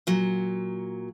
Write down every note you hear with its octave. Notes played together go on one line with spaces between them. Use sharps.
A#2 F#3